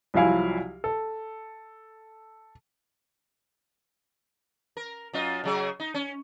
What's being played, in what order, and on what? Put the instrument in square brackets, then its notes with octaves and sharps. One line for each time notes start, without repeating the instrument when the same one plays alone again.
[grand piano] C2 F3 F#3 E4 F5 G#5
A4
[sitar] A#4
F#2 F4 D#5
C#3 F#3 G#4
D#4
C#4